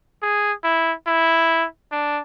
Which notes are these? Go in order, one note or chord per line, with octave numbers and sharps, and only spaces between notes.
G#4
E4
E4
D4